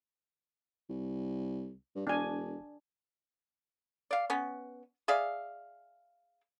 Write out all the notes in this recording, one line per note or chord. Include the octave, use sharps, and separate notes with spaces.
C2
G2
E1 D4 G#5
D5 F5
B3 C#4
G#4 D5 E5 F5